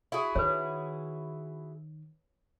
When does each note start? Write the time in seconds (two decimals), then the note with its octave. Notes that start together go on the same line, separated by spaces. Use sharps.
0.12 E4 F#4 G#4
0.35 D#3 B4 C#5